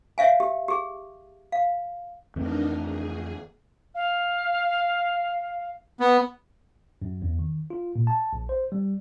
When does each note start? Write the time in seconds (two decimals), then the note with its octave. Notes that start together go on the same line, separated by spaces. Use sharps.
0.18 C#5 E5 F5 G#5
0.40 G4
0.68 G4 G#4
1.52 F5
2.36 F2 E3 A3 D4 D#4 A#4
2.83 G#4
3.95 F5
6.00 B3
7.02 F#2
7.22 E2
7.39 D#3
7.70 F4
7.96 A#2
8.07 A5
8.33 A#1
8.49 C5
8.72 G3